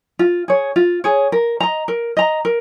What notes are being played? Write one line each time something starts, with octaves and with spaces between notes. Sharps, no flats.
F4
G#4 C#5
F4
G#4 C#5
A#4
D#5 A#5
A#4
D#5 A#5
A#4